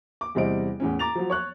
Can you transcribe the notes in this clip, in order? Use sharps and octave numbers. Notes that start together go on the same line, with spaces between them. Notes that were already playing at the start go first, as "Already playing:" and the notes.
D6
E2 C3 G3 C5 D#5 D7
E2 A2 C#4
A#5 D6 A6 F7
F3 F#3
C#5 C#6 F#6